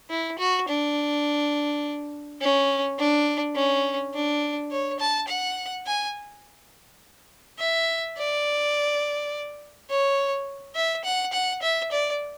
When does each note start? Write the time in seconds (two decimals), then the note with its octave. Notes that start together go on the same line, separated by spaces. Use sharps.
0.10 E4
0.39 F#4
0.68 D4
2.41 C#4
2.98 D4
3.55 C#4
4.14 D4
4.72 C#5
5.00 A5
5.28 F#5
5.87 G#5
7.59 E5
8.17 D5
9.90 C#5
10.75 E5
11.05 F#5
11.33 F#5
11.62 E5
11.92 D5